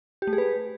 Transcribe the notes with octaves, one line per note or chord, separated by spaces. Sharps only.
G4
A3
G#4
B4